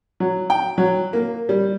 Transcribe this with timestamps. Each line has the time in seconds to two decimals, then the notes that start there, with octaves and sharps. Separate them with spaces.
0.20 F#3
0.50 G5
0.78 F#3
1.13 A#3
1.49 G3